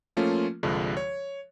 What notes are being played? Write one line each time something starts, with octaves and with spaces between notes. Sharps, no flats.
F3 A3 A#3 C#4 F4
C2 G2 D3 F3 G#3
C#5